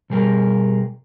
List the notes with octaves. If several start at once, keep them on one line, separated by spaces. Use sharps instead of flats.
B2 G3 G#4 A#4